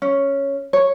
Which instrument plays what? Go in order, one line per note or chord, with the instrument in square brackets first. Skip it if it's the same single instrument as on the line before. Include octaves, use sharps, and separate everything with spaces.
[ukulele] C#4
C#5